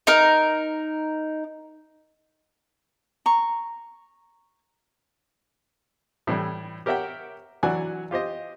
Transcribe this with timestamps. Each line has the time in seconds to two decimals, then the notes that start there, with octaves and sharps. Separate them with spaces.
0.07 D#4 A#4
3.26 A#5 C#6
6.27 A2 E3 G3
6.86 G4 A#4 C#5 E5 F#5 G5
7.63 E3 F#3 D4 F#5 G#5 F#6
8.11 F4 G4 C5 D#5